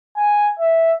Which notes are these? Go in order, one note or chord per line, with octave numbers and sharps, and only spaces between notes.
G#5
E5